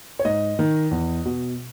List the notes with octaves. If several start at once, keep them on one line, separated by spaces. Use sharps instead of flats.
C#5
G#2 D#5
D#3
E2
B2